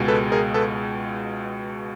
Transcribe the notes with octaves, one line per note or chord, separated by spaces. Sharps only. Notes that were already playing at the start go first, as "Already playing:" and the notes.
Already playing: C#2 B2 G#3
A4 B4
G#4 A#4
A4 B4